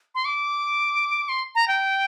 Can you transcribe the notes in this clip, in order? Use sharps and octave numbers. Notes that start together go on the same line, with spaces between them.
C6
D6
C6
A#5
G5